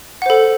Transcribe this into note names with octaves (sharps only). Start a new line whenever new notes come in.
A4 C5 F#5